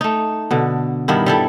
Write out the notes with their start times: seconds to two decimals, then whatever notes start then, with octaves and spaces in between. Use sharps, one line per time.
0.01 A3 D#4
0.51 B2 D3
1.08 G2 D#3 B3 E4
1.26 G3 E4 A4